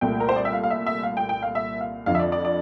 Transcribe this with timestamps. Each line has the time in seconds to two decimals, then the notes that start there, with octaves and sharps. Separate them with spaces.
0.01 C2 A#2 A3 G5
0.20 A#4
0.29 C5
0.36 D5
0.45 E5
0.53 F5
0.63 F5
0.70 E5
0.86 E5
1.03 F5
1.17 G5
1.29 G5
1.43 F5
1.55 E5
1.81 F5
2.06 F2 D3 F3 F5
2.15 E5
2.19 D5
2.32 D5
2.45 D5